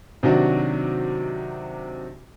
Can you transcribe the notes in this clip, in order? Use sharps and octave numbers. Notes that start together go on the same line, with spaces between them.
C3 D#3 F#3 D4 F#4